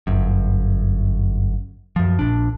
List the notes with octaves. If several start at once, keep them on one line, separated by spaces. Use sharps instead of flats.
G1 F#2
F#2 F3
A#1 D4